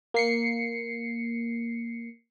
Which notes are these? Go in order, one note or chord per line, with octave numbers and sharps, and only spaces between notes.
A#3 C7 C#7